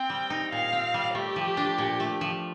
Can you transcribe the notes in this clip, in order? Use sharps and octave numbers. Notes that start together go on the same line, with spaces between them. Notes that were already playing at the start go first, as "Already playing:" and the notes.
Already playing: C4 G5
G3
D#4
A#2 F5
C4
G3
A3 G4
F3
D4
A#2
A3
F3